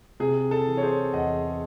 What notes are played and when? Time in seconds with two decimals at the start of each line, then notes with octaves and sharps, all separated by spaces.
0.20 C3 G#4
0.51 A4
0.67 E3
0.77 C#5
0.81 G#4 C5
1.13 E2 D#5 F#5